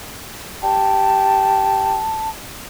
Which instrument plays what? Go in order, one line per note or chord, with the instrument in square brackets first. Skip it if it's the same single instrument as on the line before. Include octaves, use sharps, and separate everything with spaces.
[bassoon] G4 [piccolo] A5